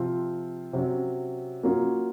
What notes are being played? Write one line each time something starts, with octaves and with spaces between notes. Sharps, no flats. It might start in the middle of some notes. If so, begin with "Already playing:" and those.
Already playing: C3 F3 C4 F4
C3 F#3 C#4
F#3 A#3 C#4 F4